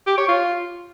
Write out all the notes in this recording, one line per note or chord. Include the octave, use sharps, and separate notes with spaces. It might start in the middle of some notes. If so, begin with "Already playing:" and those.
G4
C#5
F4